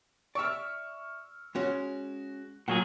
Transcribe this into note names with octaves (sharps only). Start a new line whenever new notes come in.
D5 E5 C#6 E6 F6
G#3 C#4 F#4
A#2 F#3 G#4 F#5